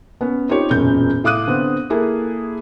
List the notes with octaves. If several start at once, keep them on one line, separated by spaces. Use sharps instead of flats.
B3 C#4
C4 D#4 F4 G4 C#5
E1 F#2 A#2 C#4 G6
A2 F5 D6 D#6 F#6 D#7
D3 B3 C4
A#3 E4 G#4 A4